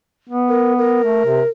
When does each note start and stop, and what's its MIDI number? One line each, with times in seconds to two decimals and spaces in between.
0.30 1.01 59
0.49 0.73 70
0.78 1.48 70
1.04 1.24 57
1.26 1.42 48